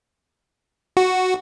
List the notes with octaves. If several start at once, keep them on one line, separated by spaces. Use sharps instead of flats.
F#4